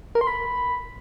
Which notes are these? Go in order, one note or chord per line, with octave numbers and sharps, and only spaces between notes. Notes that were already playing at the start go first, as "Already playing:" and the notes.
A#4
C6
B5